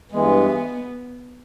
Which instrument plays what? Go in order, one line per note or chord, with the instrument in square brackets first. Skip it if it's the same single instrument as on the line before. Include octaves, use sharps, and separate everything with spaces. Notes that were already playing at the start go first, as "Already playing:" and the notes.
[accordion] G2 E3 G#3 [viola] B3